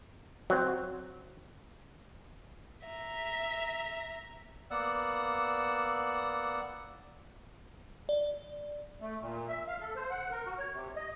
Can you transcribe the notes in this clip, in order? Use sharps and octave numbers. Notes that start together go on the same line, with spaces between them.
F#3 C4
E5 A#5
A#3 B3 D5 F#5 E6
D5
A3
A#2
E5
F5
A4
C5
F#5
A#4
F#4
C#5
C3
D#5